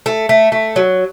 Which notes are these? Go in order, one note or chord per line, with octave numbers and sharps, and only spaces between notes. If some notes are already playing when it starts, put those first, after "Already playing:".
A3
A3
A3
F#3